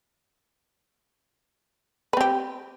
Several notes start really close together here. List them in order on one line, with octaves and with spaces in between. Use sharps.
B4 C4 G4